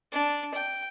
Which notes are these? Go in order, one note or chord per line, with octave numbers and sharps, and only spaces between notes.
D4
G5